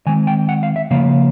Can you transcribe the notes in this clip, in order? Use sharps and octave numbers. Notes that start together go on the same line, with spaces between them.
D#3 G#3 C4 G#5
G5
F#5
F5
E5
C#3 F3 A#3 F5